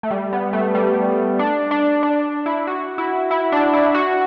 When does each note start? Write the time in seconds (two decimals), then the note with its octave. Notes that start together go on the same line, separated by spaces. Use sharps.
0.03 A3
0.11 G3
0.33 B3
0.53 A3
0.75 G3
1.39 D4
1.71 D4
2.03 D4
2.46 E4
2.67 F#4
2.98 E4
3.31 E4
3.52 D4
3.73 E4
3.94 F#4